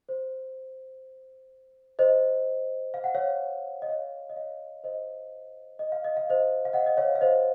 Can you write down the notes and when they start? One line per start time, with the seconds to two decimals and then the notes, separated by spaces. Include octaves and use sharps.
0.09 C5
1.99 C5 D#5
2.94 F5
3.04 F#5
3.15 C#5 F5
3.82 D#5
3.88 C#5 F5
4.30 D#5
4.36 C#5 F5
4.84 C5 D#5
5.79 D#5
5.92 F5
6.04 D#5
6.17 F5
6.30 C5 D#5
6.65 F5
6.73 D#5 F#5
6.86 D#5
6.97 C#5 F5
7.15 F5
7.21 C5 D#5